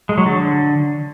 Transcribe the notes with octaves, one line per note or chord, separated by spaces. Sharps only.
G#3
F#3
D3